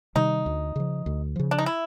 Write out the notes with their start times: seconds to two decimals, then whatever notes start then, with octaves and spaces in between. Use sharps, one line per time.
0.15 C3 D#3 G3 D#4
0.46 D2
0.76 C#3 F3
1.06 D2
1.36 C#3 F3
1.51 D4
1.58 D#4
1.66 E4